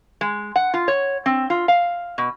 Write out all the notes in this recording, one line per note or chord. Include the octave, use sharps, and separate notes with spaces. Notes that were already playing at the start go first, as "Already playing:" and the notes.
G#3
F#5
F4
C#5
C4
F4
F5
B2